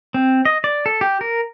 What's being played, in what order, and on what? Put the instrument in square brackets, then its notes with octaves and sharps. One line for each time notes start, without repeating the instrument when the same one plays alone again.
[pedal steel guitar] C4
D#5
D5
A4
G4
A#4